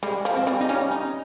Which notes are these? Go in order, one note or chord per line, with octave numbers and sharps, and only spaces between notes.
G3 G#3
F3
C4
G3
D#4
G3 C#4
D#4